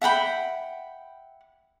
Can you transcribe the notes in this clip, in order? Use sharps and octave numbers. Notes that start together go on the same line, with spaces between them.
E5 F#5 G5 B5